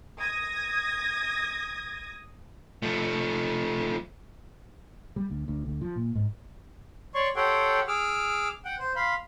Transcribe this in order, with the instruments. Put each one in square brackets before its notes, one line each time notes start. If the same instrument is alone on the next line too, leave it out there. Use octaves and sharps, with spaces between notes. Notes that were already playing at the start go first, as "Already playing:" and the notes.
[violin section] D#6 G#6 A#6
[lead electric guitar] F3 A3
[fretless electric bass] G3
D2
D2
D2
F3
A#2
G#2
[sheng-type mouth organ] C#5 D5 C6 C#6
G4 A4 C#5 F#5 G5 C6
G#4 D6 E6 F6
F#5 G5
C5
F5 B5 C6